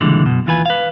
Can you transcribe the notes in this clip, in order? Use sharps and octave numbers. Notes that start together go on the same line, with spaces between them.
C#2 A#2 D3 E3 G3 G#3
F#2 B2
D#2 E3 F4 B4 G#5
B4 F5